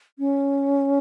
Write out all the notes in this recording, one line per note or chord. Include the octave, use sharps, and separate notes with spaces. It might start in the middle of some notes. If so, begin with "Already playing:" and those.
C#4